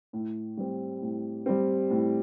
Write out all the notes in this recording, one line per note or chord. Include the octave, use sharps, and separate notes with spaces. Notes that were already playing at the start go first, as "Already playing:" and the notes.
A2
G3 C4
A2
G3 C4
A2